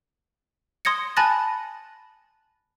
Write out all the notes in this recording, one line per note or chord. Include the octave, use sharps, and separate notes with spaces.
C6 D#6 G#6 A#6 C#7
G#5 A5 B5 F#6 A6 A#6